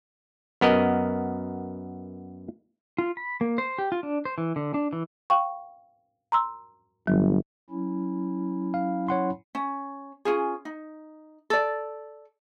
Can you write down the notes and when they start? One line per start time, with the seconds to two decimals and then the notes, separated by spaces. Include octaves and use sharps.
0.61 F#2 B3 A#4 D#5
2.98 F4
3.17 B5
3.41 A#3
3.58 C5
3.78 G4
3.92 F4
4.03 D4
4.25 C5
4.38 E3
4.56 D3
4.74 D4
4.93 E3
5.30 F5 G5 C#6
6.32 A#5 C6 E6
7.07 G1 F#3
7.70 F#3 C#4 E4
8.74 F5
9.08 C#5 F#5 C6
9.55 C#4
10.25 C#4 F4 G#4
10.65 D#4
11.50 A4 D5